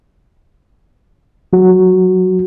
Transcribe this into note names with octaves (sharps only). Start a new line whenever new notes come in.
F#3 F#4